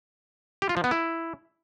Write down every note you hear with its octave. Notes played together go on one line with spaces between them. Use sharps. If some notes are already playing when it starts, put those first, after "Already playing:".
G4
F4
F3
B3
E4